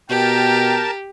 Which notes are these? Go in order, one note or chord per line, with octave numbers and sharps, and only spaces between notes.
B2 G4 A#4 G5 A5